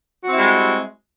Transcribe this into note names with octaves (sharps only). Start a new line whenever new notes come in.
G3 G#3 C4 E4 F#4